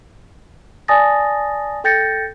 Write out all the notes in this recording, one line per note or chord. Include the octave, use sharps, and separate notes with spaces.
D5 G#5 A5 D#6 A6 A#6
A4 G5 G6 A6 A#6 C#7